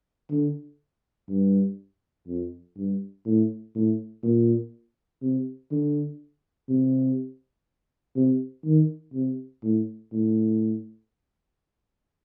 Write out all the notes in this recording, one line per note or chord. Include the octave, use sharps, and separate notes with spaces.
D3
G2
F2
G2
A2
A2
A#2
C3
D3
C3
C3
D#3
C3
A2
A2